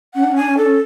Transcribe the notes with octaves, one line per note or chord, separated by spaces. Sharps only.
C#4 F#5
D4
C#4
D4 G#5
C#4
D4 A4
C#4